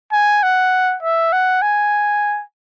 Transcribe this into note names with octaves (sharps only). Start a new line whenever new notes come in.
G#5
F#5
E5
F#5
G#5